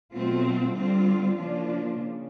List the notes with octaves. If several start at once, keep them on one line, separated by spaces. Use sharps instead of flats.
B2 F#3 A3 C4 F4
D3 G3 C4 F4
C#3 F3 A#3 D4 F4
C#3